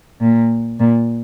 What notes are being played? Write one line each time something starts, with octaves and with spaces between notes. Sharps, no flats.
A#2
A#2